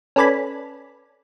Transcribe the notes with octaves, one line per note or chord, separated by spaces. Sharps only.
C#4 A4 B4 D5 G#5 B5